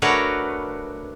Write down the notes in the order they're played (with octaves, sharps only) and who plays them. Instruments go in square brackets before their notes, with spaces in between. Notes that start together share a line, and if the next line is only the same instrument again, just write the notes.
[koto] A3 D4 F#4 A#4 B4 C#5